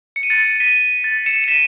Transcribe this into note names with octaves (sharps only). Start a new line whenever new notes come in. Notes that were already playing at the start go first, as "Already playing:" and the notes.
C#7
D#7
A6 C#7
B6 D#7
A6
C#7 E7
E7
B6 D#7